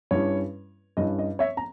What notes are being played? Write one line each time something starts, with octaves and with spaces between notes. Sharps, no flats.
G2 G3 C#4 E4 C#5
G2 G3 C#4 E4 D#5
D#5
C#5 E5
A#5